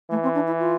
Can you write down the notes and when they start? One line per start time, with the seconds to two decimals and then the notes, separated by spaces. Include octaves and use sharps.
0.10 E3 A3
0.23 C4
0.34 D4
0.46 E4
0.59 F4